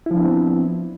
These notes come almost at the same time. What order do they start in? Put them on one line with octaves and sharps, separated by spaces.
E4 F3 D4 B3 C4